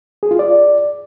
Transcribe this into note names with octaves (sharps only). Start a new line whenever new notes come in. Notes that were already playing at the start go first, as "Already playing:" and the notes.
G#4
F4
D5